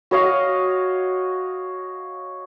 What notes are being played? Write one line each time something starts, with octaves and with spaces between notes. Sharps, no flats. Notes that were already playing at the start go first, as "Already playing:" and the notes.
F#4 C#5 D#5 F5